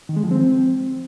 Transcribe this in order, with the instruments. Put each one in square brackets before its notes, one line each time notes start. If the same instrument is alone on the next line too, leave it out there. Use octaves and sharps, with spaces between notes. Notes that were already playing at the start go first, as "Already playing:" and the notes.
[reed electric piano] D#3
G#3
F3
C4